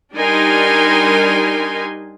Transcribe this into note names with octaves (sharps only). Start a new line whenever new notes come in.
G3 D4 D#4 A#4 G#5 C6